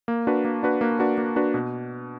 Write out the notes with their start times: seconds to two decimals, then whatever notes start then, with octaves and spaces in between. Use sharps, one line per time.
0.08 A#3
0.27 D4 F#4 B4
0.45 A#3
0.63 D4 F#4 B4
0.81 A#3
0.99 D4 F#4 B4
1.18 A#3
1.36 D4 F#4 B4
1.54 B2